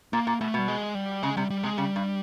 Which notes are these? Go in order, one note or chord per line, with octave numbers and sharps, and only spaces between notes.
A#2 A#3
A#2
B2 A3
B2 G3
G#3
G3
C#3 G#3
C3 G3
G3
C3 G#3
C#3 G3
G2